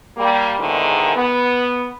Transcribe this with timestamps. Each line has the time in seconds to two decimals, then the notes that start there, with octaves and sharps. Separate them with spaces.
0.17 G3 A#3
0.58 E2 G#2 D3 D#3
1.15 B3